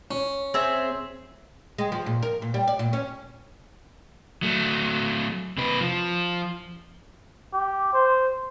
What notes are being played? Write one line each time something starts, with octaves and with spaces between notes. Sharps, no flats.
C#4
C4 G#4 E5
G#3
F3
A#2
A#4
A#2
G3
D5
A#2
C#4
F#3 A3
C3 B4
F3
G4
C5